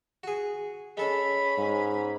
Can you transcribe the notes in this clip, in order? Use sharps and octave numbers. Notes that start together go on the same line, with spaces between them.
F#4 G#4
G#3 C#4 A4 B5
G#2